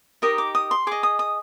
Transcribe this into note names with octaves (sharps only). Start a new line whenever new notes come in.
D#4 G4 A#4 D#6
D6
D#6
C6
G#4 D#5 D6
D#6
D#6